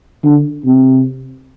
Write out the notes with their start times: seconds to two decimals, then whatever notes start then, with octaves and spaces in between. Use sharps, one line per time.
0.24 D3
0.65 C3